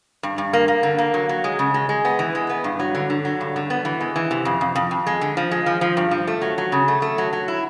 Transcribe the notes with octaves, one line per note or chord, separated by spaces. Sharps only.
G2
G2
A#3
A#3
D3
A#3
F#3
F#3
G#3
C#3
G#3
G#3
B3
E3
G#3
B3
G2
F#3
D3
D3
F#3
G2
D3
B3
E3
G#3
E3
C3
F2
F2
F2
F2
G#3
D3
F3
G#3
F3
F3
G2
F3
A3
F#3
F#3
C#3
A3
A3
F#3
F#3
E4